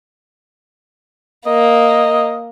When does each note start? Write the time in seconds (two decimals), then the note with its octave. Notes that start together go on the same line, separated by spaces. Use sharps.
1.47 A#3 D#5